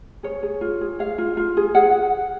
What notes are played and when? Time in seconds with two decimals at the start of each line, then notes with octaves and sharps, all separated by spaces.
0.23 G#4 C#5
0.43 G#4
0.61 F4
0.81 G#4
0.99 G#4 F5
1.18 F4
1.37 F4
1.57 G#4
1.75 G#4 F#5